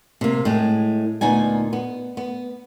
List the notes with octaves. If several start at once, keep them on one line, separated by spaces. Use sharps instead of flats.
C3 A#3
A2 G#3
D2 A#2 B3 D#4 G#5
B3
B3